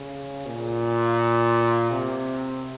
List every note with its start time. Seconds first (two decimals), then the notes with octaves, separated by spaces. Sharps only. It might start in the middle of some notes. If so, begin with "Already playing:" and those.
Already playing: C#3
0.46 A#2
1.91 C3